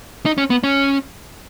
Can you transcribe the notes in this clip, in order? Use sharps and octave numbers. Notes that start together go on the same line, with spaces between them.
D#4
C#4
B3
C#4